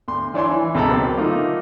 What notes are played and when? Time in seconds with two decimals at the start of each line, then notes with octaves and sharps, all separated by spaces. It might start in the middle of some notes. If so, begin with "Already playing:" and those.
0.08 D2 C6
0.34 E3 D4 C#5 G#5 C6
0.51 E3
0.75 C#2 B2 A4 A#5 B5
0.90 F#3 A#3 C4
1.17 D3 A3 A#3 D#4 F4